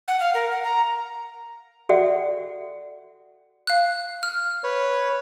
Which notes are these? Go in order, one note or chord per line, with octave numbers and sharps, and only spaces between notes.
F#5
F5
A#4
F#5
A#5
F#4 A4 D5 E5 F#5 G5
F5 F#6
F6
B4 C#5